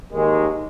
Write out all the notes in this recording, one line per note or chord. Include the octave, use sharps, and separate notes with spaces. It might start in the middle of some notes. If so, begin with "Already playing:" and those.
D#2 D#3 G#3